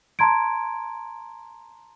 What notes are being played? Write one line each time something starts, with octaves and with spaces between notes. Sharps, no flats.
A5 A#5 C6 G#6 D7